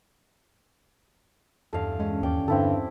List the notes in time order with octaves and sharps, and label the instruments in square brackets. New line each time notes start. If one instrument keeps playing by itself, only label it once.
[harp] E2 G2 [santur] A4 F5
[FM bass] G#3 [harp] C#4
[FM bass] D#2 [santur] D5 G5
[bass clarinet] G2 [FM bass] D3 [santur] C4 E4 A4